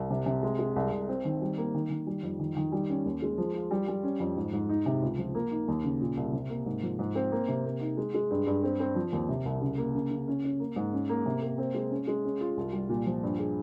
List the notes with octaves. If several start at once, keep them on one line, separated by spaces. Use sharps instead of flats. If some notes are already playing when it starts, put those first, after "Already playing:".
Already playing: C2
C3
C3
G#3
G#3
C2
C2
C4
D#3
G3
A#3
D#3
D#3
G3
F2
D#3
D#3
G3
C#4
D#2
G#3
F3
F4
G3
G3
C#4
F2
G#2
G#2
D#4
C3
C#2
F3
A#3
D#4
D#2
C#3
A#2
C2
C3
A#3
G#2
F3
G#2
C4
A#3
C3
A#3
D#4
G#3
G#3
G2
G2
C4
C4
F3
D#2
C3
C2
C#3
A#3
C#3
C#3
C#4
C#4
A#3
G#2
C#4
A#3
C3
A#3
C4
G#3
C#4
G#3
C#4
F4
C2
G3
A#2
F3
G2
G#4